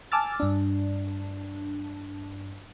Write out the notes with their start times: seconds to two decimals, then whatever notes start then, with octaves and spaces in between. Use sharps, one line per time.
0.12 G#5 A5 D6 E6 F6 A6
0.40 G2 D4